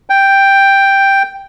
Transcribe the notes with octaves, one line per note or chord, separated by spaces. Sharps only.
G5